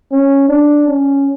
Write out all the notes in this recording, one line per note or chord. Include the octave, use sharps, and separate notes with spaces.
C#4
D4
C#4